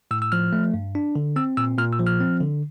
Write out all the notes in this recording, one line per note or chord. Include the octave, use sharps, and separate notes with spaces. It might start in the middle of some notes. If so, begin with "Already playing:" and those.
A2 E6
E6
F3 F6
A3
G2
D4
D3
C4 E6
A#2 E6
A#2 F6
E6
F3
F6
C4
D3